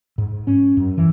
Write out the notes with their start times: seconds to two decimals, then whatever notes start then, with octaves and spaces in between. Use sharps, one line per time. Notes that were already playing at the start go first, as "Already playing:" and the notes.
0.18 G#2
0.47 C#4
0.77 F#2
0.97 E3